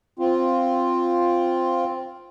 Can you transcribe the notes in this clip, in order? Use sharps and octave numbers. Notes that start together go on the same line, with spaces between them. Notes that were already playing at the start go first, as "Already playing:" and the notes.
C4 F4